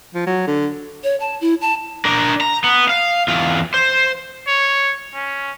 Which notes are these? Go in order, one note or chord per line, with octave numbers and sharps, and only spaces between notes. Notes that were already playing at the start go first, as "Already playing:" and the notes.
F3
F#3
D3
C#5
A5
E4
A5
D4 A#4
A#5
B3
F5
E2 F4
C5
C#5
C#4